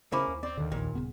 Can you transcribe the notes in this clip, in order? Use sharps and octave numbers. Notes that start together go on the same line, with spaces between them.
C#3 A#3 C#4 E4 C5 B5 D6
D#2
C4 D5
D#2 D3 D#3
A#1 E2 A#2
D#1 C#3 B3